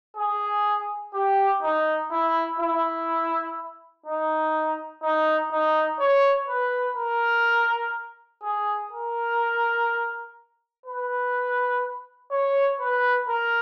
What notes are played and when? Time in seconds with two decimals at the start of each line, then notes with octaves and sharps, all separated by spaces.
0.17 G#4
1.14 G4
1.63 D#4
2.11 E4
2.60 E4
4.06 D#4
5.03 D#4
5.51 D#4
6.00 C#5
6.49 B4
6.97 A#4
8.43 G#4
8.91 A#4
10.86 B4
12.31 C#5
12.80 B4
13.29 A#4